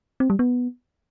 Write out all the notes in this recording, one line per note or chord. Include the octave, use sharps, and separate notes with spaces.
C4
G3
B3